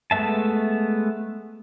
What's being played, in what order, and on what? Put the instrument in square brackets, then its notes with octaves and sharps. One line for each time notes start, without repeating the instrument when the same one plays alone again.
[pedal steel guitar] G#3 A3 B3 E5 A5